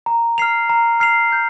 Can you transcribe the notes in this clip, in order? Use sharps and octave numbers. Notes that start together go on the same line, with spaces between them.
A#5
F6 C7 F7
A#5
F6 C7 F7
G6